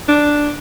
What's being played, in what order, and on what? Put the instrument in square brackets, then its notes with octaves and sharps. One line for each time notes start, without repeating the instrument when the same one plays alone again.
[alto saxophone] D4